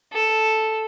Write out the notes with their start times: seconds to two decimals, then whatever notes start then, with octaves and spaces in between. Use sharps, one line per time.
0.13 A4